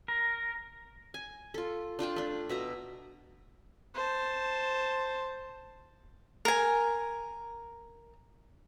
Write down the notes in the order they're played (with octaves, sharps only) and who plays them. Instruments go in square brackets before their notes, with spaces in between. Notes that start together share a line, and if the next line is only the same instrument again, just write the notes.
[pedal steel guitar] A#4
[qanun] G#5
F4 A4
D4 F4 G5 A5
A3 D4
B2 E5 A#5
[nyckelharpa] C5 A5
[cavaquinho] A#4 G#5